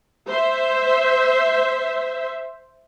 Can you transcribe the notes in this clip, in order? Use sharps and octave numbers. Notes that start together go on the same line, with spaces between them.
C5 E5